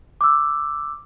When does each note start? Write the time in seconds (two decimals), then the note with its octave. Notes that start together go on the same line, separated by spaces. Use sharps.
0.21 D6 E6